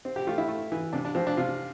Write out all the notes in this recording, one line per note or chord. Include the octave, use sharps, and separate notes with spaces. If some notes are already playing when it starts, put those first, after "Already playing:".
C4
G4
A3 F4
E4
A3
E3
C3 D4
D4
F3 C4
D4
C3 F4